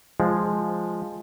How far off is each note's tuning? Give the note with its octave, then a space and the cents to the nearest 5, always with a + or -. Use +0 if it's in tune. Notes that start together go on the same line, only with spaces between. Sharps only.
F3 +0 G#3 +0